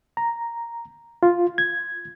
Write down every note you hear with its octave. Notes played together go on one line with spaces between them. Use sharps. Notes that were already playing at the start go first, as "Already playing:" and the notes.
A#5
F4
G#6